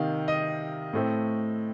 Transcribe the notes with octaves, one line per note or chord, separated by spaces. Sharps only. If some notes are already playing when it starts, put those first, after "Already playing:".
Already playing: C3 D#3 A#3 F5
D#5
A2 A3 C4